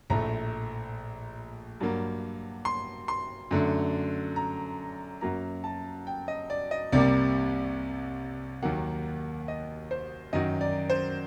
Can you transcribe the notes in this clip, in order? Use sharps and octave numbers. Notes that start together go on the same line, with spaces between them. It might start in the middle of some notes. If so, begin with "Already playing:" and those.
A#1 A2 A3 A#5
G2 F#3 A#3
C6
C6
F#2 D3 A3
A#5
F#2 F#3 A#3 A#5
A5
G5
D#5
D5
D#5
C2 C3 G3 A#3 D5
D#2 D#3 F#3 A#3 F#5
D#5
C5
F#2 D#3 F#3 D#5
D5
C5